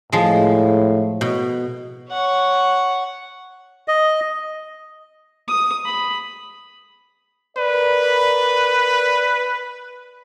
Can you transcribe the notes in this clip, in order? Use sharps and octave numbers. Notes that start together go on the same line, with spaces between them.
A2 F3 G#3
B2
C#5 F#5
D#5
D#6
B5
A#4 B4 D5